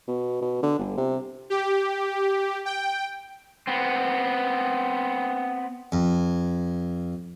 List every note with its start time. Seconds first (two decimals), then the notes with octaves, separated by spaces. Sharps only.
0.07 B2
0.42 B2
0.63 D3
0.79 G1
0.97 C3
1.50 G4
2.65 G5
3.67 B3 C4
5.92 F2